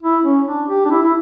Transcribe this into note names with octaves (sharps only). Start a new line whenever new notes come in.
E4
C#4
D4
G4
D4
E4
E4